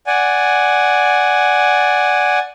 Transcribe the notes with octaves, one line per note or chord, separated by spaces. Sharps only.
D5 F#5 G#5